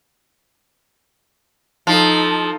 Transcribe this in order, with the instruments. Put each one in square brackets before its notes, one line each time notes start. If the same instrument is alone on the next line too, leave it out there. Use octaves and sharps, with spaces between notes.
[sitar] F3 [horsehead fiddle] D#4 A4